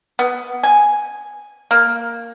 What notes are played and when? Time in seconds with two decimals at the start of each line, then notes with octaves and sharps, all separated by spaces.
0.19 B3
0.63 G#5
1.71 A#3